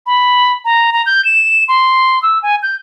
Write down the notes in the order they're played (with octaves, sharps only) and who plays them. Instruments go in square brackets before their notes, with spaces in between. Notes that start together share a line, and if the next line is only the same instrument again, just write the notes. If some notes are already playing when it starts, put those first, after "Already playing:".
[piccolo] B5
A#5
A#5
G6
E7
C6
E6
G#5
G6